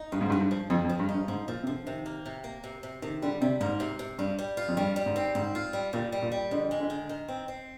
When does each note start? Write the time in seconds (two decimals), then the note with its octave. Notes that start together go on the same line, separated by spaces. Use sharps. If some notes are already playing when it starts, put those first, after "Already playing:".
Already playing: D#4
0.12 G2 F3
0.21 G#2
0.30 G2 F3
0.41 G2
0.51 F3
0.70 F2 F3
0.84 F2
0.89 F3
0.99 G2
1.09 D#4
1.14 G2
1.28 G#2 F3
1.48 A#2 F3
1.63 C3
1.67 D3 F3
1.86 C3 D#3
2.06 A#3
2.26 C3
2.44 A#3
2.64 C3
2.83 C3
3.02 C3 D#3
3.22 D3 G3
3.41 C3 G3
3.61 G#2 A#3
3.80 C3
3.99 C3
4.18 G2 G3
4.39 G3
4.57 F4
4.68 F2
4.77 G2 G3
4.96 G3
5.06 G#2
5.16 C4
5.35 G#2 C4
5.55 F4
5.73 G3
5.93 A#2 G3
6.12 G3
6.22 A#2
6.32 G3
6.51 F2 D3
6.71 G#3
6.80 D3
6.90 D#3
7.09 D#3
7.28 C4
7.48 C4